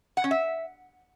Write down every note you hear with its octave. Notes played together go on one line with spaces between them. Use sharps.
F#5
C#4
E5